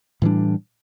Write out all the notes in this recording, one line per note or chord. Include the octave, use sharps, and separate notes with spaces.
A2 E3 G3 D4